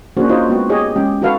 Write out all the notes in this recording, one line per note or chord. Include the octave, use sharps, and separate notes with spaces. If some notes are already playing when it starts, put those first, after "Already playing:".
A#3 C#4 D4 F#4 G#4 C5
D#4 F4 F#4 C5 C#5 D#5
G#3 B3 F#4 G5
G4 G#4 C#5 D#5
G#3 C#4 G4 G5
D#4 F#4 A4 B4 F5 F#5